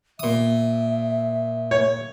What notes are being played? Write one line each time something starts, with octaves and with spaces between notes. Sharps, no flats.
A#2 E5 D#6
C#5